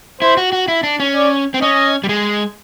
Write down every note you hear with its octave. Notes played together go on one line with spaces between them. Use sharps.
E4 C5
F#4
F#4
E4
D4
C#4
D5
C4
C#4 D#5
G3
G#3